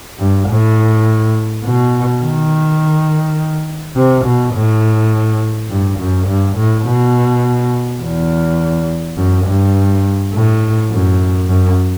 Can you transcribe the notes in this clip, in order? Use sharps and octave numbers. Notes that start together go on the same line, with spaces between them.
G2
A2
B2
D#3
C3
B2
A2
G2
F#2
G2
A2
B2
E2
F#2
G2
A2
F#2
F#2